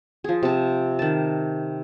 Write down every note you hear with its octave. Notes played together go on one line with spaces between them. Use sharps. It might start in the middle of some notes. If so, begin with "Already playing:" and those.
F3 G#4
C3 A5
D#3 A5